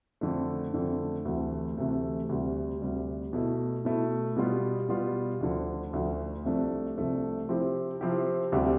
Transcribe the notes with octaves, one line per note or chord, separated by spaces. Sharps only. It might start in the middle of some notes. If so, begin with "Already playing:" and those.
F2 D3 A3
F2 D3 A3
D2 C3 E3 A3
D2 C3 E3 A3
D2 C3 G3
D2 C3 G3
B2 A3 E4
B2 A3 E4
B2 G3 B3 F4
B2 G3 B3 F4
D2 D3 F3
D2 D3 F3
C2 C3 F3 A3 D4
C2 C3 F3 A3 D4
C3 F3 C4 E4 G4
C3 F3 C4 E4 G4
D2 C3 G3 D4 G4